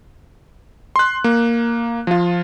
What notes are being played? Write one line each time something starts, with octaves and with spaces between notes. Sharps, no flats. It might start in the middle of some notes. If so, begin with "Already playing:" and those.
C6 F#6
A#3
F3 F4